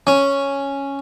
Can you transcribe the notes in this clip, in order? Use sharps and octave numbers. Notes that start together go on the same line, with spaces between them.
C#4